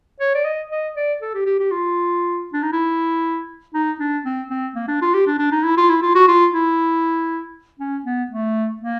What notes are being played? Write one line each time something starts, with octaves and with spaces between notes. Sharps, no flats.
C#5
D5
D#5
D#5
D5
A4
G4
G4
G4
F4
D4
D#4
E4
D#4
D4
C4
C4
A#3
D4
F4
G4
D4
D4
D#4
E4
F4
E4
F4
F#4
F4
E4
C#4
B3
A3
A#3